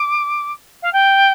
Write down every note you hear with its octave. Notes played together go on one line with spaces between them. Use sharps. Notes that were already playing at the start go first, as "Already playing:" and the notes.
Already playing: D6
F5
G5